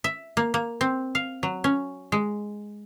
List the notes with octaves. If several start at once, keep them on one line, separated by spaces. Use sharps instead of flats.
E5
A#3
A#3
C4
F5
F#3
C#4
G#3